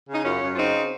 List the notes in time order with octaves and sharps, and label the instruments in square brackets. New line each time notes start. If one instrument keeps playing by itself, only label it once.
[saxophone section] C#3
D#4
F#2 C#4 F4
F#2
F4
C#3 C4 D#4